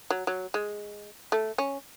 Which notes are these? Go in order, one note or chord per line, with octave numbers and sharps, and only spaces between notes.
F#3
F#3
G#3
A3
C#4